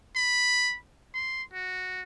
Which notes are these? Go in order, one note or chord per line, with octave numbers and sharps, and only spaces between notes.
B5
C6
F#4